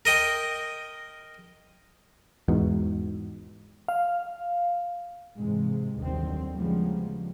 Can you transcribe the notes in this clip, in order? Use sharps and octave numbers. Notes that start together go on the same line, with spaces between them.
A#4 D#5 G5
E2 G#2 B2
F5
G#2 C3 E3 G#3
G1 D#2 D3 D#3 F#3 C4
C#3 F3 G3 G#3 A#3 B3